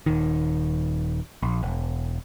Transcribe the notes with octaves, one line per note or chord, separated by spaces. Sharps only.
D#1 D#3
A#1
E1